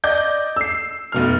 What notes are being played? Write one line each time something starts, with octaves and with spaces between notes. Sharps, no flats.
D5 D#5 D6 G6
E6 C7
F1 B2 F6